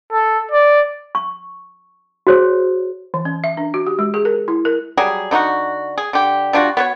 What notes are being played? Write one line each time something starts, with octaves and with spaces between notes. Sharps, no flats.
A4
D5
C#6
F#4 G#4 C5 C#5
E3
C#4
E5
D4
F#4
G4
G#3
G#4
A#4
E4
A#4
F#3 G3 G#4
D3 D#4 F4 F#4
G#4
D3 G4
G3 D4 F4 F#4
B3 F#4 C#5